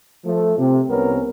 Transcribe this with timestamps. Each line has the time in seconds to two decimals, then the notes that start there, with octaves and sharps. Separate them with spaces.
0.25 F3 A3
0.58 C3
0.89 C2 C3 G3 B3 C#4 A#4